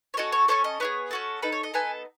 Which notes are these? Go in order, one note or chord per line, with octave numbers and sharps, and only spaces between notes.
C#5
C#4 F#4 A4 D#5
C#5
C#4 E4 A4 C#5
D#5
B3 E4 G#4 C#5
C#4 F#4 A4
D#4 A4 B4
C#5
D#5
B3 D#4 A4 G#5